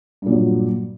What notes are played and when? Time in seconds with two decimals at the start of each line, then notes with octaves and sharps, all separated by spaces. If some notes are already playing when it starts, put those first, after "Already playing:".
0.22 G2
0.26 A#2
0.30 F#3